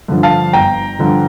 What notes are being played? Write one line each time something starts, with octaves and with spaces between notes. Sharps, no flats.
G2 D3 F3
F5 A5
G1 G5 A#5
G2 D3 F3